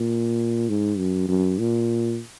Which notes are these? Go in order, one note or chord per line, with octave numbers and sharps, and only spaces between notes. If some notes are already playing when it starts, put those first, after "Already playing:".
Already playing: A#2
G#2
F#2
F#2
A#2